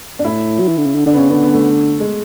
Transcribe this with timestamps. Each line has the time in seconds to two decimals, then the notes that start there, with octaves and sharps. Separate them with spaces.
0.19 D4
0.25 A2 E4
0.60 F#3
0.68 E3
0.77 D3
0.86 C#3
0.95 D3
1.06 D3 D4
1.13 B3
1.18 C#3 C#4
1.30 D3 B3
1.42 B3
1.54 A3
2.00 G#3